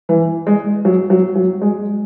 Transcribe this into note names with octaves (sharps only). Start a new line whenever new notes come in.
E3
G#3
F#3
F#3
F#3
G#3